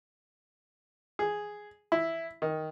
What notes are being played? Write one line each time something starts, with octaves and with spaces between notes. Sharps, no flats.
G#4
E4
D#3